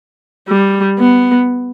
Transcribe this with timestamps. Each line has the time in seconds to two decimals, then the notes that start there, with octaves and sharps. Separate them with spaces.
0.48 G3
0.99 B3